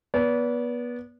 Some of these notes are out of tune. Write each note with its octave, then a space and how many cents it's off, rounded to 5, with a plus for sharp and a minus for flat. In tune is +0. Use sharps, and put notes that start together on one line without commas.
B3 -25 D5 -35